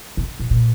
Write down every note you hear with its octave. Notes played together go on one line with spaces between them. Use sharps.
C3
B2
A#2